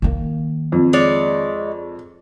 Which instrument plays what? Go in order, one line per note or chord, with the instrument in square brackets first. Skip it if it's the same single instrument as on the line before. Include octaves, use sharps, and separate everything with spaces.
[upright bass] D#3 A#3
[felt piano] F2
[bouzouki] G#3 C#5 D5